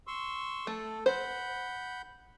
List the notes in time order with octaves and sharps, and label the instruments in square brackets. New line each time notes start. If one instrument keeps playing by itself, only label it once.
[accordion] C6 C#6 E6
[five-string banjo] A3 [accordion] A4
[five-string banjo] C5 [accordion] F#5 B5 G6